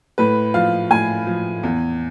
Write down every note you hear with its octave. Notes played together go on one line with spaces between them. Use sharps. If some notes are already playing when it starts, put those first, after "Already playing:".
A2 B4
F3 F5
A2 G#5
F3
E2